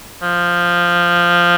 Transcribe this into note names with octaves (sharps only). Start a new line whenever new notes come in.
F3